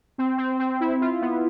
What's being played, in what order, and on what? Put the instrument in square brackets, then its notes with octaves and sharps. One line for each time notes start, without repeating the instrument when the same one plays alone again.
[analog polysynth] C4
C4
C4
E4
F4
B3